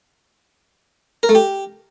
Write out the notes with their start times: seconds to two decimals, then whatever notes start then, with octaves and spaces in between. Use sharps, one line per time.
1.23 A#4
1.29 A3
1.35 G4